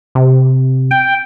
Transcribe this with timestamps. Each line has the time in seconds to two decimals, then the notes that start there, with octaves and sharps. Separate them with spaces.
0.15 C3
0.91 G5